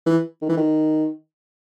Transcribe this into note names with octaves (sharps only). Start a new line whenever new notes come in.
E3
D#3
E3
D#3